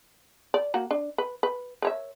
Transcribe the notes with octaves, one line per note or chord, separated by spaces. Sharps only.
D5
A#3 F#4 A#5
D4
B4
B4
A#4 C#5 E5